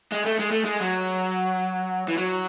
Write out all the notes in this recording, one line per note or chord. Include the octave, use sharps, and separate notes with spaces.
G#3
A3
G#3
A3
G#3
F#3
E3
F#3